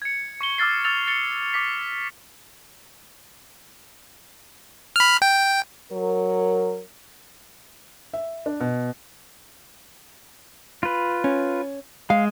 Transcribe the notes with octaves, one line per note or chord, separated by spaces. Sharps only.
G#6 C#7
C#6 C#7 G7
D6 E6 F6 A6 C7
E6 F6 A6 F7
A6 C#7 G7
D6 B6 C7
B5 F6
G5
F#3 A#4
E5
D4
B2
F4 B4
C#4
G#3 F5